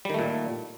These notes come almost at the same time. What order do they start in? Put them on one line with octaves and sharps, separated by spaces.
G3 D#3 A3 A#2